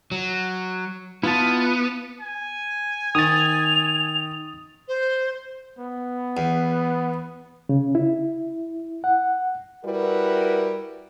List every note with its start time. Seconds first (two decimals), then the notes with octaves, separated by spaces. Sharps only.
0.11 F#3
1.23 B3 E4 F4 A5
2.21 G#5
3.15 D#3 D#6 A6 F7
4.88 C5
5.79 B3
6.37 E2
7.69 C#3
7.95 E4
9.04 F#5
9.85 G3 E4 F#4 A#4 B4